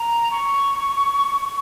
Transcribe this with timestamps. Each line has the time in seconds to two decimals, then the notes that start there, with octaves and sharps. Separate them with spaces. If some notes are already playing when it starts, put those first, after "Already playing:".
Already playing: A#5
0.31 C#6